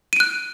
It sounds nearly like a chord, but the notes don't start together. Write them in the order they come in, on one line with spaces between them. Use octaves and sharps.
D#7 D7 F#6